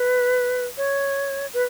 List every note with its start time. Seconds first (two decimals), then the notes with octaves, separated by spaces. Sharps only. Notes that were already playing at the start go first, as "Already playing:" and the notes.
Already playing: B4
0.77 C#5
1.54 B4